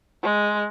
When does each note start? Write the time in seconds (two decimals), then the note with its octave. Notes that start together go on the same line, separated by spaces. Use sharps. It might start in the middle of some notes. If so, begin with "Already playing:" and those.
0.22 G#3